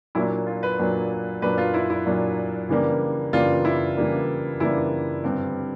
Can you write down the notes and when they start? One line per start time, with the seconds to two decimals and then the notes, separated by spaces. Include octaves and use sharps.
0.15 A#2 F#3 A#3 D4 E4
0.47 F4
0.63 B4
0.79 A#2 F#3 A#3 D4
1.42 A#2 F#3 A#3 D4 B4
1.58 F4
1.74 E4
1.90 E4
2.06 A#2 F#3 A#3 D4
2.69 C#3 E3 G3 A#3 D4
3.33 C#3 E3 G3 A#3 D4 F4
3.65 E4
3.97 C#3 E3 G3 A#3 D4
4.60 C#3 E3 G3 A#3 D4 E4
5.24 G2 D3 G3 C4